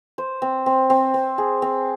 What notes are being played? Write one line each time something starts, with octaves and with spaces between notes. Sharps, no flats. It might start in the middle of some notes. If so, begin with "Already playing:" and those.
C5
C4
C4
C4
C4
G#4
C4